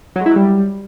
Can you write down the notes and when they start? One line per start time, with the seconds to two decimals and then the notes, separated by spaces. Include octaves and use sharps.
0.16 F#3
0.21 G#3
0.26 E4
0.31 F#3
0.36 G3